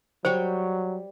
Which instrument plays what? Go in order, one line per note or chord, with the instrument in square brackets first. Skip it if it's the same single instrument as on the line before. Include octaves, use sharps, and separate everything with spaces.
[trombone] F#3 [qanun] G3 C#5 G5 [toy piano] C5